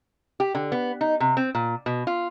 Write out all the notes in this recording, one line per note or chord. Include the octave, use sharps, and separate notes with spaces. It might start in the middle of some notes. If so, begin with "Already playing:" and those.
G4
D3
B3
D#4
C3
C4
A#2
B2
F4